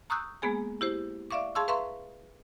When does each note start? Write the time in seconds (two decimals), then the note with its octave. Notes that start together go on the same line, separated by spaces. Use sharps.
0.10 A#5 C#6 D#6 E6 F#6 G6
0.42 G#3 A#3 B3 G#4 G#5
0.81 E4 G4 C5
1.31 D5 E5 F5 C#6 D6
1.55 G#4 F5 A5 C6 C#6 E6
1.68 B4 E5 F5 A#5 C6 C#6